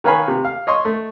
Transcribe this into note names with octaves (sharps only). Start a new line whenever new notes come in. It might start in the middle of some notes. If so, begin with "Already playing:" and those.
D#3 B4 C#5 F5 G#5 B5
C3
F5
C#5 D#5 C6 C#6
A3